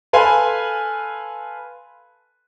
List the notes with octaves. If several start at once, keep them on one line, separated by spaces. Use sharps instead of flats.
A4 B4 F5 G#5 B5 C6